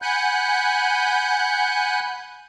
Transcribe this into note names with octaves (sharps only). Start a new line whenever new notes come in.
F#5 G#5 B5 F#6 G6